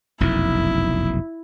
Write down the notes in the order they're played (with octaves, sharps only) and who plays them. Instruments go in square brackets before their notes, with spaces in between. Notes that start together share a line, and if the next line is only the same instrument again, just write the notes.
[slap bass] F1 B1 F#2 [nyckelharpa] E4